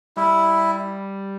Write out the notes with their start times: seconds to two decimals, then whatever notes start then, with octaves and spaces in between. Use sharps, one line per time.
0.17 G3 E4